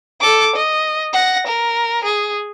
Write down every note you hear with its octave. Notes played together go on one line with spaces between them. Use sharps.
A4 D6
D#5
F#5 A#6
A#4
G#4